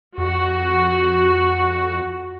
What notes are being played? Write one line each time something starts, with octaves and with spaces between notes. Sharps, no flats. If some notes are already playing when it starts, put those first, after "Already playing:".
F2 F#4